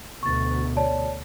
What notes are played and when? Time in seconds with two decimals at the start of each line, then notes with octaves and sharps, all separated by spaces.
0.23 D2 B2 C#6 A6
0.76 C#5 D5 A5